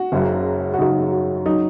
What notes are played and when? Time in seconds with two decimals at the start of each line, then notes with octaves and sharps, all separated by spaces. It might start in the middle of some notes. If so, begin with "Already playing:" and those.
Already playing: F#4
0.12 F#1 F#2 C#3 F#3
0.74 F#4
0.78 F#1 F#2 C#3 F#3 D#4
1.12 F#4
1.46 F#3 D#4